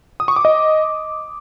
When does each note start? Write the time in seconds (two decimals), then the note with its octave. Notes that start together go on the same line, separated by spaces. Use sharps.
0.20 D#6
0.28 C#6
0.36 D6
0.45 D#5